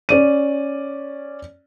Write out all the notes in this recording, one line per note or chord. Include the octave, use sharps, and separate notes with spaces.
C#4 D5 D#7